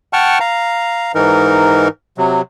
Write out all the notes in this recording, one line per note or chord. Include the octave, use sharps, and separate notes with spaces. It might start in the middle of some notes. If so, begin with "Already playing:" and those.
F#5 G5 A5 C#6 F6
F5 A#5
G#2 E3 D#4 A#4
C3 F#3